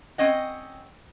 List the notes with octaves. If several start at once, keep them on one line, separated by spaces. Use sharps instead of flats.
C4 C#4 D#5 F#5